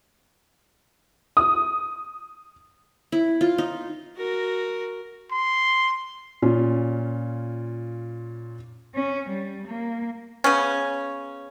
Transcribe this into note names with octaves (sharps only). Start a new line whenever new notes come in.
D#6
E4
F4
D#4
F#4 A#4
C6
A#2 C#4 F4
C#4
G3
A#3
C#3 B3 C#4